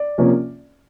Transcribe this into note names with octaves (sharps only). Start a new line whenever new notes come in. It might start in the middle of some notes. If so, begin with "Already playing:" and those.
Already playing: D5
C3 F3 A#3 C#4